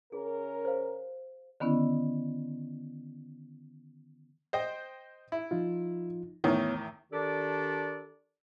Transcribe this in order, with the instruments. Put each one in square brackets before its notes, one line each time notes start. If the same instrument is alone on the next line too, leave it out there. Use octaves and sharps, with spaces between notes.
[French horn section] C#3 C#4 A#4 [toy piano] G#4
[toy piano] C5 F5
[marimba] D3 D#3 B3 C#4 E4
[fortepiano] C5 D#5 G5
E4
[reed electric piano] F3 D#4 F4
[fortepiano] E2 A2 D#3 [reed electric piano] B3 E4 C#5
[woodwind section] D#3 D4 G4 A4 D5